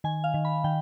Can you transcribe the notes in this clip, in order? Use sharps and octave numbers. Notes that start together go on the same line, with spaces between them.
D#3 G#5
F5
D#3
B5
D#3 G5